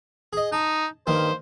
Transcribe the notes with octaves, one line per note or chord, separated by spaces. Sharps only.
G#4 D#5
D#4 A5
G2 D#3 A#3 C5